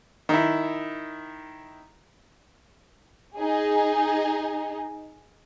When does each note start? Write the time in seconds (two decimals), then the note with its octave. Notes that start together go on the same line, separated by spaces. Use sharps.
0.29 D#3 E4
3.36 D#4 G#4